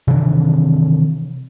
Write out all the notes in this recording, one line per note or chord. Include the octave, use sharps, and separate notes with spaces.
C3 D#3 E3 D4